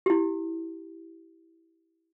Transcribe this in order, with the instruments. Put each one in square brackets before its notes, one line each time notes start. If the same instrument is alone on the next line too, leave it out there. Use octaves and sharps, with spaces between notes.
[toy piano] E4 G4